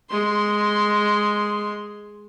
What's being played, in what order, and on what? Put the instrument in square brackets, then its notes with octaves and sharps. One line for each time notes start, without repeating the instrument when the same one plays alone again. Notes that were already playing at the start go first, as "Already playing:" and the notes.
[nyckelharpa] G#3 C6